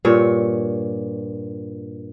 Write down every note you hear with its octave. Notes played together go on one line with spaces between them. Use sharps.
G2 A#2 C#5